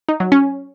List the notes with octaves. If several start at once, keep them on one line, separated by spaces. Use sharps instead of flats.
D#4
F#3
C#4